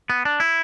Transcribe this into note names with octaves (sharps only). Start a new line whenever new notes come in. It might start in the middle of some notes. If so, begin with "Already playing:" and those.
B3
D4
E4